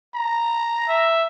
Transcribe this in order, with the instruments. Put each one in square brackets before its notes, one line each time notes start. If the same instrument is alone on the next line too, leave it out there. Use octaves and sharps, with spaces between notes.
[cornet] A#5
[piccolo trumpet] E5